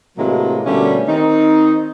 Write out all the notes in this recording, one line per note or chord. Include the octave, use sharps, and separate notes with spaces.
A2 C3 E3 F#3 G#3 A#3
B2 D3 G3 A3 A#3 C#4
D#3 C4 D#4